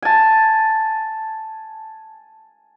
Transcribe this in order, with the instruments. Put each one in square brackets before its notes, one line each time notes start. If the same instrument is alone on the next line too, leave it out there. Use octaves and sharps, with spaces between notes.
[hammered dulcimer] G#5 A5